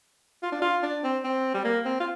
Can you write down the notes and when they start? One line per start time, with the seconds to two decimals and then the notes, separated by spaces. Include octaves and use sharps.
0.43 F4
0.52 D4
0.62 F4
0.83 D4
1.04 C4
1.24 C4
1.54 G3
1.65 A#3
1.86 C4
2.00 F4